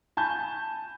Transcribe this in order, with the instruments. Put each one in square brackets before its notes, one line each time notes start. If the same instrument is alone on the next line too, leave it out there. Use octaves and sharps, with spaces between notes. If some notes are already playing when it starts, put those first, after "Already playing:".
[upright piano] G#5 A5 B5 G6